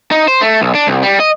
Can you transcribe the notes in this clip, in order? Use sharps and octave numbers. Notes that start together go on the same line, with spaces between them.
D#4
C5
A3
B1
D4
C2
G3
D#5